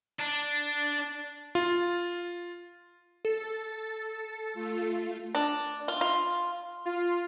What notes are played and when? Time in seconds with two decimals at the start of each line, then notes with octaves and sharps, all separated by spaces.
0.19 D4
1.55 F4
3.25 A4
4.54 A3 F4
5.35 D4
5.88 F4
6.01 F4
6.86 F4